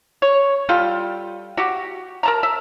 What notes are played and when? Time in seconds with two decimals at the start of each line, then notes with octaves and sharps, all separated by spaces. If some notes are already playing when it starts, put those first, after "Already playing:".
0.22 C#5
0.69 G3 F4 A4 G5
1.57 F#4 G4
2.23 A#4 A5 A#5
2.43 E5